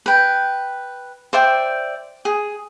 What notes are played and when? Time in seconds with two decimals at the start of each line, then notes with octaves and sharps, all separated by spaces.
0.06 B4 G5
1.33 C5 D5 E5 G5
2.25 G#4